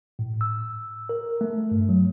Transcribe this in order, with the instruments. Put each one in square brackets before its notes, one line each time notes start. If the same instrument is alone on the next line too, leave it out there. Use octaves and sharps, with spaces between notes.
[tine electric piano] A2
E6
A#4
A3
G2
F#3